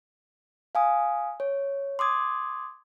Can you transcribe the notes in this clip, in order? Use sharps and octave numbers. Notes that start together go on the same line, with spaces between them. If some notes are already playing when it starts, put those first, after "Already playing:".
F5 G#5 D#6
C#5
C6 D6 D#6 G#6